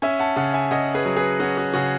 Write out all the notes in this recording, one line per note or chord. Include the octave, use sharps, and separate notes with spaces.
C#4 E5 G#5
F#5 A5
C#3 F#5 A5
E5 G#5
C#3 D#5 F#5
G#4 B4
F#3
G#4 B4
C#4 F#4
F#4
C#3 F#4